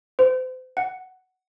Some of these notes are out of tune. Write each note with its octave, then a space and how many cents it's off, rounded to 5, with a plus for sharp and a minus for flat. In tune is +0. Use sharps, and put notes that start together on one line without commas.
C5 -35
F#5 +10